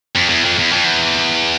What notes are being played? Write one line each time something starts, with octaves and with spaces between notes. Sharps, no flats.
F2
E2
F2
E2
F2
E2